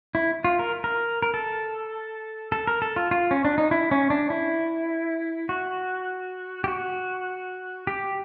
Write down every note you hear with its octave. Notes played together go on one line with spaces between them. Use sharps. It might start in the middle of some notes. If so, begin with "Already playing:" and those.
E4
F4
A#4
A#4
A#4
A4
A4
A#4
A4
F4
F4
C#4
D4
D#4
E4
C#4
D4
E4
F#4
G4
F#4
G4